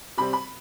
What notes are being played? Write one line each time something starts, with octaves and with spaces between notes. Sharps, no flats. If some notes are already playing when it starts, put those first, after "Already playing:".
C3 G3 C4 B5
B5